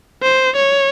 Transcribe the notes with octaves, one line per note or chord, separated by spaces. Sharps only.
C5
C#5